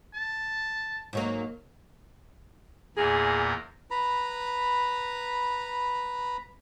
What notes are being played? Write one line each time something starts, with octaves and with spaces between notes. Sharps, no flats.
A5
G#2 F#3 A#3
E2 A#2 G#4 A#4
B4 A#5 B5